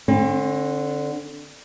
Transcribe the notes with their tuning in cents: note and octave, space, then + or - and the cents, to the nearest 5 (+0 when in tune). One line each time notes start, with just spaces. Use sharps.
D3 +5 C4 +45